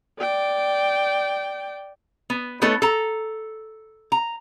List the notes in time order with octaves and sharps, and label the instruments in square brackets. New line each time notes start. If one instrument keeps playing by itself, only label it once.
[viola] D5 G5
[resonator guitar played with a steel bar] B3
A3 B3 D#4 A4 C#5
A4 A#5
A#5